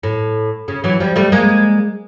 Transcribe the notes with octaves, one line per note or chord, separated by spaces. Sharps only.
A2
C#3
E3 F#3
F3 G3
G3 A3
G#3 A#3